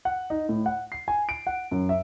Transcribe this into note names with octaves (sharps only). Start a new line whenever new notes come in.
F#5
D#4
A2
F#5
C7
G#5
D7
F#5
F#2
E5